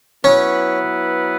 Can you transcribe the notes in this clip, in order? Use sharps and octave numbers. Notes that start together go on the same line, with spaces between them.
F#3 B3 C#4 E4 B4